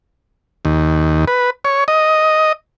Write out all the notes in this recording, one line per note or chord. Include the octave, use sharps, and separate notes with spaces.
D#2
B4
C#5
D#5